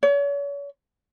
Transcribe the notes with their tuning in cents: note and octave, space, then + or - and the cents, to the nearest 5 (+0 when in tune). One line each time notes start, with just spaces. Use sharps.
C#5 +40